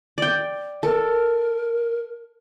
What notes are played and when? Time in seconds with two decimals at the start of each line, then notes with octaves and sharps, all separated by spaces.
0.18 D5 G5
0.83 A4 A#4